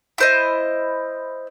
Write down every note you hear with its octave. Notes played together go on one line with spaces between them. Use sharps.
E4 C5 D#5